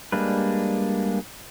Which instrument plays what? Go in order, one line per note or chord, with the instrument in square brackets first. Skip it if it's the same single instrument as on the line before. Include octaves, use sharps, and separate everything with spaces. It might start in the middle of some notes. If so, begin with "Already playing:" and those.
[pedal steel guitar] G3 G#3 A#3 D4 B4